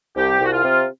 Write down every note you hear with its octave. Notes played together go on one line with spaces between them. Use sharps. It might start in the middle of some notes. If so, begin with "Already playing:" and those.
C2 G4
C2
F#4
F4
C3